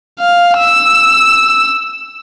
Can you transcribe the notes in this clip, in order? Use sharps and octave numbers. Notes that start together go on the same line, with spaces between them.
F5
E6